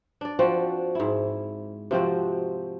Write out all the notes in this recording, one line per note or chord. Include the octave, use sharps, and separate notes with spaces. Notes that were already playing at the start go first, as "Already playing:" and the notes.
D4 D5
F3 C4 F#4
G#2 E4
C3 F3 C4 F#4